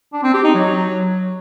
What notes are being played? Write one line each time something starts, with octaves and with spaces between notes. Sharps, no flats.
D4
C4
G4
D#4
F#3